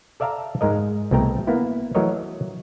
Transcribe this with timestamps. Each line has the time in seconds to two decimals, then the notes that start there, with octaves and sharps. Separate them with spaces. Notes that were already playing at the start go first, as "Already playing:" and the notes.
0.20 A4 D5 E5 F5 A5 A#5
0.61 G#2 G#3 A#4 D#5
1.11 C2 B2 G#3 A3 G5 A#5
1.47 A#3 B3 E4
1.95 E3 F#3 A3 A#4 C#5 D#5